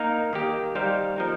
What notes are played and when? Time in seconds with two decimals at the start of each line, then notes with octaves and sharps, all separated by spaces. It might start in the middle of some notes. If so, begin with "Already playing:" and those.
Already playing: A#3 D#4 A#4 F5
0.33 D#3 A#3 G4
0.75 G3 D#4 G4 C5 F5
1.16 F3 A#3 D#4 A#4